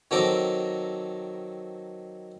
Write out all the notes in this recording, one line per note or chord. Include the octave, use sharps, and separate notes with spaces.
D#3 F#3 C4 A4 A#5 D6